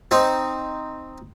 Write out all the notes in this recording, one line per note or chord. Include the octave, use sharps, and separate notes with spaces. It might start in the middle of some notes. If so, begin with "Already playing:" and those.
C4 D#4